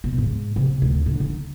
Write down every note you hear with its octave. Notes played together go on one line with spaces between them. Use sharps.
B2
G#2
C3
D2
D3
D#4